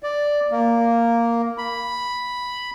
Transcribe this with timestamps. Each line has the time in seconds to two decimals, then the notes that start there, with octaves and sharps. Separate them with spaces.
0.03 D5
0.51 A#3
1.58 B5